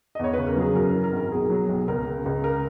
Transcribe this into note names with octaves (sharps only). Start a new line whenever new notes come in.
D#5
E2 C#5
C#3 B4
A#4
F#3 G#4
F#2 A#4
A#4
E3
A#4
G#1
A#4
B1 G#4
F#3
B1
C#2 A#4
C#3
C#2
A#4